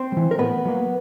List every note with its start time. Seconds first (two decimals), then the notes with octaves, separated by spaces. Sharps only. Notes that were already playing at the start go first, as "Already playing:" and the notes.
Already playing: C4 C5
0.12 G3
0.17 E3
0.31 A#4
0.38 A2 B3 B4
0.65 F#3 A#3